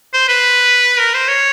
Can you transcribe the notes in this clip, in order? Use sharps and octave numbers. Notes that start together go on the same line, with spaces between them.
C5
B4
A#4
C5
C#5